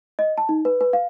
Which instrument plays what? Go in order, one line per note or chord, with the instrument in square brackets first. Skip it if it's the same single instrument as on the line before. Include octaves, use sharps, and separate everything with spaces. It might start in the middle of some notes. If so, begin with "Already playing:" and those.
[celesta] D#5
A5
D#4
B4
B4
F5